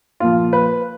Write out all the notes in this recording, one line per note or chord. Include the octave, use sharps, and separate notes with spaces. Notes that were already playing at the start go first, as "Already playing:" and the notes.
A#2 F3 F4
B4